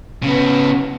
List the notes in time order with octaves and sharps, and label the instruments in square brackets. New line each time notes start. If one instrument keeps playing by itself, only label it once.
[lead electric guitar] C#3 B3